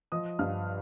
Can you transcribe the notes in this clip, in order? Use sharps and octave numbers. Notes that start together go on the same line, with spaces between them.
F3 D#5 D#6
G2 F5 F6